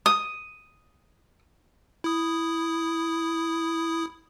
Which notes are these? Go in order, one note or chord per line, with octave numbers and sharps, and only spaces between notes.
D#6
E4 D#6